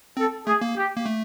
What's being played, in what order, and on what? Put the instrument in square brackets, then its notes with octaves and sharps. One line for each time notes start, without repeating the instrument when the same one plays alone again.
[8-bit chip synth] C4 [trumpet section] A4
[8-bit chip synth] A3 [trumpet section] G#4
[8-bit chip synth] A#3
[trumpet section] G4
[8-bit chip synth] A#3
A3